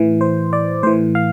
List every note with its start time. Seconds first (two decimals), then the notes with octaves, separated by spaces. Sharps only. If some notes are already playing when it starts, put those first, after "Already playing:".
Already playing: A2 E3
0.21 C5
0.53 D5
0.83 A2 E3 C5
1.15 F5